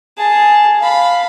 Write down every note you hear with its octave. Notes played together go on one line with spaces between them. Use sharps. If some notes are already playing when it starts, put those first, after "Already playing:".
G#4 A5
F5 B5